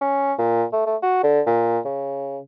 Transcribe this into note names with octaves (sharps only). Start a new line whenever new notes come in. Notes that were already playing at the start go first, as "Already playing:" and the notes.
C#4
A#2
A3
A3
F#4
D3
A#2
C#3